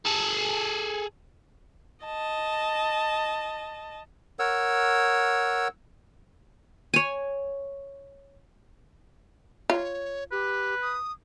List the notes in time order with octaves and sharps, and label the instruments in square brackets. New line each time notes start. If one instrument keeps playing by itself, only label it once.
[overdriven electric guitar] G#4 A4
[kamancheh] D#5 A5
[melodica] A#4 C#5 F#5 E6
[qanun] C#5 G#5
[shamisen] F4 [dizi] C#5
[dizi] G4 [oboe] B4
[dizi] D#6